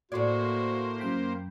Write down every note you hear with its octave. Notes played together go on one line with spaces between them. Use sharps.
A2 A#3 F#4 C5 D5 C6 G#6
F#2 G5 B5